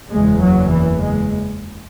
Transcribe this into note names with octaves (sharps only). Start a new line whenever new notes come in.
F#1 E2 C#3 G#3
F#3
E3
G#3